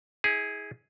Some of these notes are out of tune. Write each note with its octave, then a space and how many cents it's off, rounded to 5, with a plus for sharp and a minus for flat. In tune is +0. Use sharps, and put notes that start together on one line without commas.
E4 -35 G#4 +0